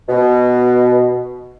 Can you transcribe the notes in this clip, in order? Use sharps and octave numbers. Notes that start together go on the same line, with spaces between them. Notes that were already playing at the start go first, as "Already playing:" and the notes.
B2